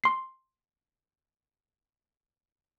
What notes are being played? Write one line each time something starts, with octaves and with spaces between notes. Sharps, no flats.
C6 C7